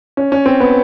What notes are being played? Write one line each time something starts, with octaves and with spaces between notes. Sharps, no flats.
C#4
C#4
C4
B3